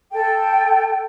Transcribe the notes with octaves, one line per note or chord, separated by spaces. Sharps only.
A4 G5